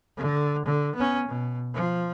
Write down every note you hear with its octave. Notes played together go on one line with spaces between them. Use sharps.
D3
D3
B3 C#4
B2
F3